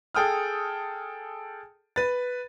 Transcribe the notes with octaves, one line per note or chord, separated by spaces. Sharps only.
G#4 A4 G5 D#6 F6
B4 A6